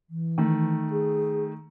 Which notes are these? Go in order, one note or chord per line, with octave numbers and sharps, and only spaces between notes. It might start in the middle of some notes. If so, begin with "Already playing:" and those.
E3
D#3 A3
G#4